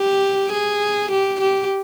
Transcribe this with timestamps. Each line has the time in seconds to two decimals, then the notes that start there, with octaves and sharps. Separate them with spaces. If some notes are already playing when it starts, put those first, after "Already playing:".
Already playing: G4
0.52 G#4
1.12 G4
1.42 G4